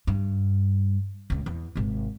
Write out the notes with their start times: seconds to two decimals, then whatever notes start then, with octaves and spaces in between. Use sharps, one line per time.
0.07 G2
1.30 C#2 C#3
1.46 E2
1.75 G#1 C3